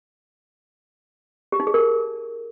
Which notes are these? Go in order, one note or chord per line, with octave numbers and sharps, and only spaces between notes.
G4
D#4
G#4
A#4